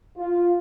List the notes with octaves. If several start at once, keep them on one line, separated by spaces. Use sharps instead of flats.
F4